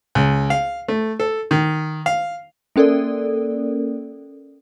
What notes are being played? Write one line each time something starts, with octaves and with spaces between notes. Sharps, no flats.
C#2
F5
A3
A4
D#3
F5
A#3 C#4 A4 A#4 D5